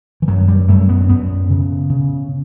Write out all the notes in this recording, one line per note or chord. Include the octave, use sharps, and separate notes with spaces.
E3
F#2 F#3
G3
F#2 A3
B3
F#2 B3
C#3
C#3